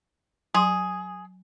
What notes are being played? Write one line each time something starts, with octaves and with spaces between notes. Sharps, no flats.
F#3 G#4 C6